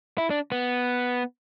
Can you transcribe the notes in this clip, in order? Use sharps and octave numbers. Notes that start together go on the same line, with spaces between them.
E4
D4
B3